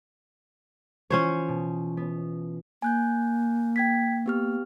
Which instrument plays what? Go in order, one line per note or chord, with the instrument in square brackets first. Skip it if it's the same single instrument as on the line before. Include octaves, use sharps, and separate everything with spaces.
[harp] E3 F4 [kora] C#4 C5 C#5
[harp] B2
B3
[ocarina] A#3 [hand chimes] G#5 F#6 G6
[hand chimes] G5 G#6 B6
B3 G4 F6